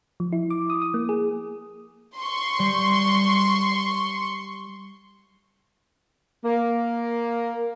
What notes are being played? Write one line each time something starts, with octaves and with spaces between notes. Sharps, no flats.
F3
E4
D6
D#6
D#6
A#3
G#4
C6 C#6
G3
A#3